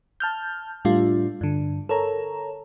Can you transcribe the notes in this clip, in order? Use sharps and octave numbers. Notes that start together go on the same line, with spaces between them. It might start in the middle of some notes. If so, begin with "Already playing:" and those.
A5 F6 G6
A2 G3 A3 D4 F4
G2 D3
A4 A#4 C#5 A#5